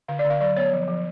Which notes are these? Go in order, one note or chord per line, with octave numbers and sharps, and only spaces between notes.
D3 F5
D5
D3
F5
F#3 D5
B3 C#5
F3
F3